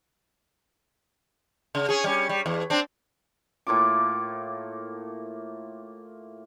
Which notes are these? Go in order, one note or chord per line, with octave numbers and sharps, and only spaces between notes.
C#3
C#4 G#4
G3 C#4
G3
E2
C4 D4
A2 A#3 F4 D6